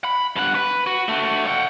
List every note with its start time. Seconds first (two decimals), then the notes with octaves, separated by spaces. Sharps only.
0.04 B5
0.36 G2 F#5
0.55 B4
0.87 F#4
1.09 A3 F#4
1.47 F#5 G5